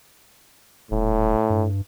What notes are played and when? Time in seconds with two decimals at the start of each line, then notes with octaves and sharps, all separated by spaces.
0.91 D#1 A2
1.50 G2